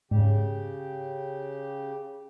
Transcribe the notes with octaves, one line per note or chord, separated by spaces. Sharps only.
G#2 C#3 G4